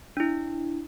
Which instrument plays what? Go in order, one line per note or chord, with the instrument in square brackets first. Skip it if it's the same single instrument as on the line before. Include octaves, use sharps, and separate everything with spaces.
[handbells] D4 E4